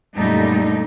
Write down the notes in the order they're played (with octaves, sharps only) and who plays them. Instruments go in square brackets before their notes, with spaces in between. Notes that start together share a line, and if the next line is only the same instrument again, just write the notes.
[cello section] F#2 A#2 D3 G3 A3 D#4